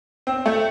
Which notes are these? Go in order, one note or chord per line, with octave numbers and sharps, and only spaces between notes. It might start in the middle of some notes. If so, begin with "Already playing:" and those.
C4
A3